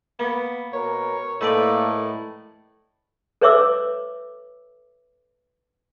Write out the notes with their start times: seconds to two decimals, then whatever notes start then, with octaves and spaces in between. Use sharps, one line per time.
0.19 A#3 B3
0.74 B2 A#4 C#5
1.41 A2 A#3 D#4 A4 B4 D5
3.41 A4 B4 C#5 E5 D6 E6